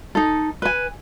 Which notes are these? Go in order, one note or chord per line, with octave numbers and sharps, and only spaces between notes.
D#4 A4
B4 G#5